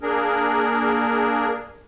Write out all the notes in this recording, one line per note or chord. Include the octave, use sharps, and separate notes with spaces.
A#3 D4 G#4 A#4